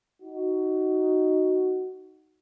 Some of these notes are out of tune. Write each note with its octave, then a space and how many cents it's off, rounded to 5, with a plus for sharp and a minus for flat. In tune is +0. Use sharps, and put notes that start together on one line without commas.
D#4 +0 F#4 +10